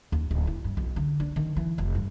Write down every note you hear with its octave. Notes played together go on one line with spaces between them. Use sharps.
D#2
D1
E4
G2
B1
D3
D4
D#3
E3
F1
G2